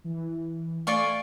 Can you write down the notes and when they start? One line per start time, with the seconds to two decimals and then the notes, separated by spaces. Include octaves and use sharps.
0.04 E3
0.87 A3 F4 D5 G#5 C#6